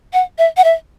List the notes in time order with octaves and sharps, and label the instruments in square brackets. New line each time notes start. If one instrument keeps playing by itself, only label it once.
[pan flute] F#5
E5
F#5
E5